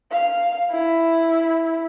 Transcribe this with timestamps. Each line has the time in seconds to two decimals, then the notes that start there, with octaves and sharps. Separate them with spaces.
0.11 F5
0.71 E4